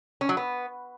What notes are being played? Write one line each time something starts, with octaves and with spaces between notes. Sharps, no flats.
C#4
F#3
B3